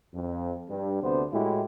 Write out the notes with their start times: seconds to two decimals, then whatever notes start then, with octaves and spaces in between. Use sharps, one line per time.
0.14 F2
0.70 G2
1.02 D2 C3 B3 D4 C5
1.33 A2 G#3 E4 F#4 G4